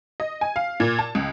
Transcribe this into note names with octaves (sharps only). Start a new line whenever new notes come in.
D#5
G#5
F5
A#2
A5
C#2